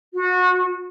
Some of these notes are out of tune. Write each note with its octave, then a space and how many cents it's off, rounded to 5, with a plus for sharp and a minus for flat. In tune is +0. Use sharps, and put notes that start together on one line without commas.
F#4 -25